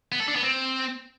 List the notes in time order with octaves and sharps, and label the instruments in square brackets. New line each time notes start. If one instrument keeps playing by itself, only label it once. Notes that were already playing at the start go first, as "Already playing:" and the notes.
[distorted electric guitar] B3
A4
D4
B3
C4